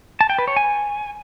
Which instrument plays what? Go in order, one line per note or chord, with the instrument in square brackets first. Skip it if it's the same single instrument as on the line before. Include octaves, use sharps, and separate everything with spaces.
[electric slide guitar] A5
G5
B4
C#5
G#5